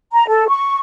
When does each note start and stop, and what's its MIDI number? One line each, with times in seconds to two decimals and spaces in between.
0.12 0.27 82
0.28 0.47 69
0.48 0.78 85